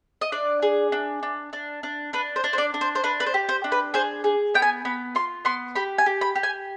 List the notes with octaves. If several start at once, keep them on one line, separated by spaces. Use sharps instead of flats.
D#5
D4 D5
G#4
D4
D4
D4
D4
D4 B4
C5
D4
C5
D5
D4
C5
C5
D4 B4
B4
C5
G4
C5
D4
B4
G#4 C5
G#4
B3 G5
G#5
B3 B5
F4 C6
B3 C6
G4 B5
G#5
G4
B5
G4
G#5